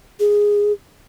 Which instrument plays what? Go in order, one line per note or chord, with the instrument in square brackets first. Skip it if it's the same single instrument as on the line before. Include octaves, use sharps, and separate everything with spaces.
[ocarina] G#4